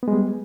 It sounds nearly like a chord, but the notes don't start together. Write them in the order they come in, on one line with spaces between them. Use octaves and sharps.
B3 G#3 G3